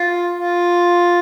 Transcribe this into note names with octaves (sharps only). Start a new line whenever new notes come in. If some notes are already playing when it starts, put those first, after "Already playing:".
Already playing: F4
F4